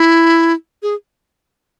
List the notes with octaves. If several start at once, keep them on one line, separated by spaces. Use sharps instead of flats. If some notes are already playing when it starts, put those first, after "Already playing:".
Already playing: E4
G#4